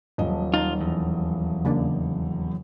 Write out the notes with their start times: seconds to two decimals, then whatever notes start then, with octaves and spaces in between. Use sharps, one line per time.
0.18 D#1 F3 F#3 D#5
0.54 D#4 F4
0.81 E2
1.65 C#3 A#3 D4